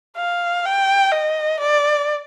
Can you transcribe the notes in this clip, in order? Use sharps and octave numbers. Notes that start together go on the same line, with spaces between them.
F5
G5
D#5
D5